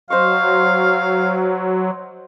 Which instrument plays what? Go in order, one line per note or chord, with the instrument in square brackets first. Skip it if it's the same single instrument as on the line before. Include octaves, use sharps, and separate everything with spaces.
[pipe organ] F#3 [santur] C5 D#5 C#6 [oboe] F5